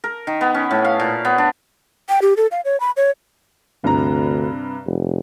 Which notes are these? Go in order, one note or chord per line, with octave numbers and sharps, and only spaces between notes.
A#4
D#3
B3
C#4
A2
F5
A#2
B3
D4
G5
G4
A4
F5
C#5
B5
C#5
D2 G2 C3 A#5
F1